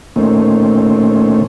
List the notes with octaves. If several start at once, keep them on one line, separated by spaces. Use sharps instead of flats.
A#2 D#3 A3 C4 C#4